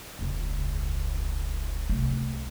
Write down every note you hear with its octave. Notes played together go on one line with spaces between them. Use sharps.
E1 C#2
C2 A3